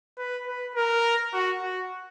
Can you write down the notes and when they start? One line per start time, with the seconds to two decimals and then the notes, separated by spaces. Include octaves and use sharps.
0.18 B4
0.47 B4
0.76 A#4
1.33 F#4
1.62 F#4